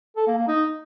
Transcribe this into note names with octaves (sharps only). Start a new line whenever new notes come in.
A4
A#3
A#3
D#4